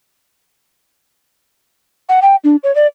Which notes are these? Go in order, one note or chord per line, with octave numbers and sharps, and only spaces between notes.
F#5
G5
D4
C#5
D5